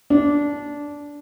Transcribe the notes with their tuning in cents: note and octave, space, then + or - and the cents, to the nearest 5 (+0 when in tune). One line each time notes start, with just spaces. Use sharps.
D4 -15